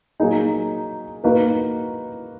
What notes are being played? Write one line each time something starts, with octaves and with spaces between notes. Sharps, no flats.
F#3 A#3 D#4 G#4
A#3 D#4 F#4 B4